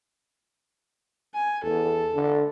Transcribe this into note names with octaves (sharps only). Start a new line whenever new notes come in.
G#5
E2 A4
D3